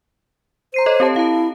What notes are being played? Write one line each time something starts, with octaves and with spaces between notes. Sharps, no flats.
C5 A#5 C7 D#7
A4 C#5 D#5
C4 G4 A5
E4 F5 A5